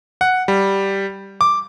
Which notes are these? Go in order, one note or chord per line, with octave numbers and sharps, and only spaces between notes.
F#5
G3
D6